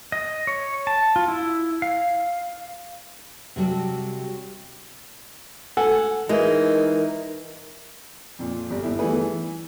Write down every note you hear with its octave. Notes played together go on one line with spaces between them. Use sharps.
D#5
C#5
A5
F4
E4
F5
C3 F#3 G3 A4
A4 F#5 G#5
E3 G#3 D#4 A#4
F2 A#2
G1 G3
G1 E4
E3 G3 A3 B3 G#4 B4
E3